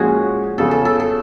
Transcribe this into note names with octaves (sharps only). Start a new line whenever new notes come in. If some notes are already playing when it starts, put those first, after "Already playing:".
Already playing: A#2 F3 G#3 C#4 F#4 G#4
E2 C#3 F3 A4
A4
A4
A4